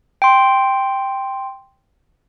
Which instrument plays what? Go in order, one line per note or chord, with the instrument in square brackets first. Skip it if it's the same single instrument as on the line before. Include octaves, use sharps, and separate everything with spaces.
[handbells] G5 C6